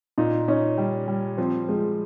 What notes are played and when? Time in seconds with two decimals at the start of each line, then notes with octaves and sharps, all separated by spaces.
0.18 A#2 D#4
0.48 C#4 D#4
0.78 G3
1.08 G3
1.38 F3 C4
1.69 F3 G#3